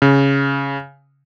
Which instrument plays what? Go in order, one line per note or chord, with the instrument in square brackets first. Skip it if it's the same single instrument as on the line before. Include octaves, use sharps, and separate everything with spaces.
[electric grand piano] C#3